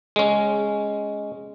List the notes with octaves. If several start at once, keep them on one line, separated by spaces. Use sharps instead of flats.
G#3 C#4